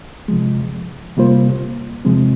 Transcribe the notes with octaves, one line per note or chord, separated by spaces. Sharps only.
C3 F3 G#3
C3 G3 A#3 F4 C5
E2 C3 F3 G#3 C4